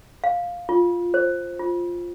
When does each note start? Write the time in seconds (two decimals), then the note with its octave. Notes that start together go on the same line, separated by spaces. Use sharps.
0.24 F5
0.69 F4
1.14 C5
1.59 F4